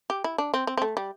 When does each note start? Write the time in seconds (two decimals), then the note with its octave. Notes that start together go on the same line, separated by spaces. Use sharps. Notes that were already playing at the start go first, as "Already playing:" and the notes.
0.10 G4
0.24 E4
0.38 D4
0.54 C4
0.67 C4
0.77 C4
0.82 A3
0.97 G3